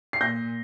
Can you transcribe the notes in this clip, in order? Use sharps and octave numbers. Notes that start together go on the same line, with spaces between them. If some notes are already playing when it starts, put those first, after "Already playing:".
C7
A#2 G6 A#6